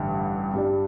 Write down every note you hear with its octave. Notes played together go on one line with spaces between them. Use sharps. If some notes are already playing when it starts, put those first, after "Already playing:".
Already playing: A1 G2 D3
G2 G3 D4